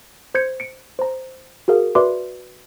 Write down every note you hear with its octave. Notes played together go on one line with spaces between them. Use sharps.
C5 G6 G#6 C#7
C#7 D7
C5 A#5
F#4 G#4 A#4 F5
F#4 B4 D5 E5 C6 D6